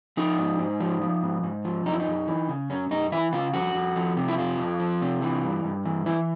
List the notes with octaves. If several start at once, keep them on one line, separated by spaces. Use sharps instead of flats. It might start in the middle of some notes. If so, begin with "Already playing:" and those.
F3 D#4
G#2
G#2
F3
F3
G#2
G#2
F3
F#2 D#4
E4
D#4
F#2
E3
C#3
F#2 C#4
F#2 D#4
E3 E4
C#3 F4
F2 F#4
F2
F3
C3
E4
F2 F4
F2
F3
C3
E3
G2
G2
E3
E3 E4